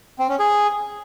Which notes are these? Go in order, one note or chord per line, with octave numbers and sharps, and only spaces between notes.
C4
C#4
G#4